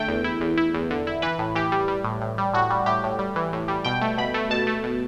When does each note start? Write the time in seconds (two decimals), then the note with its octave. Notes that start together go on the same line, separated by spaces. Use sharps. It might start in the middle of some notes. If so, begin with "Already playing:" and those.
Already playing: D3 A3 G5
0.08 E2
0.24 E4
0.41 E2
0.57 E4
0.74 E2
0.91 D3
1.07 E4
1.22 E3 B4
1.39 A2
1.55 E3 G4
1.72 G3
1.88 G3
2.04 A2
2.21 A2
2.38 G3
2.54 A2 F#4
2.70 G3
2.86 A2 G4
3.04 A2
3.19 G3
3.36 E3
3.53 A2
3.68 G3
3.85 B2 G5
4.01 A3
4.18 B2 B5
4.34 A3
4.50 B2 A5
4.67 A3
4.83 B2